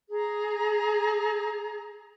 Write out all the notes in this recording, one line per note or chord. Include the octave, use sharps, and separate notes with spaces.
G#4 A#5